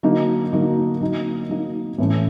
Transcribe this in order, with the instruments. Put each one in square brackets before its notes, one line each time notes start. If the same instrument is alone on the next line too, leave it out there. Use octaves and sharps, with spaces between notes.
[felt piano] D3 F#3 A#3 D#4
D3 F#3 A#3 D#4
F#3 A#3 D#4
F#3 A#3 D#4
A2 E3 A3 C#4